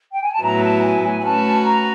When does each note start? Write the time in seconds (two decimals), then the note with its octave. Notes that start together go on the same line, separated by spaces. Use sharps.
0.13 G5
0.23 G#5
0.32 A5
0.42 A2 F#3 B3 E4 A#5
0.62 A5
0.82 G#5
1.03 G#5
1.23 A3 C#4 F#4 B4 A5
1.63 A#5